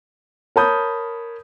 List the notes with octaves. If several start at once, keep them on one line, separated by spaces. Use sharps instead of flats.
A#4 C#5 A5 B5 D#6 G6